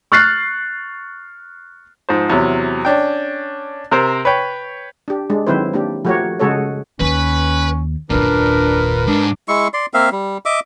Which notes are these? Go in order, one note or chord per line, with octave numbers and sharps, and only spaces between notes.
C#6 F6 F#6 A6 C7
G#2 F3 C5
E2 C3 F#3
C#4 D4 G5
C3 A#4 C5
B4 C#5 G5
D4 G4
G#3 D4
D#3 F#3 C4 E4 B4 C5
A#3 D4 G4
F3 A3 F#4 G4 A#4 C#5
C#3 G#3 F#4 G#4 A4 C#5
D#2 C#4 B4
F#1 D#2 A#2 D4 A#4 B4
G#2 D4
G#3 E4 C#6
D5 C6
A#3 C4 E5 F5
G3
D#5 E5 D6